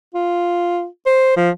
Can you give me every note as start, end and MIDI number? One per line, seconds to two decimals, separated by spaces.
0.15 0.86 65
1.06 1.34 72
1.37 1.49 53